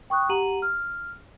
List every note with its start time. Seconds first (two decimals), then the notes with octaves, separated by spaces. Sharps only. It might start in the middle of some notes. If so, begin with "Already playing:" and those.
0.10 G5 C#6 D#6 F#6
0.29 G4 F#5 A#5 D#7 F#7
0.62 F6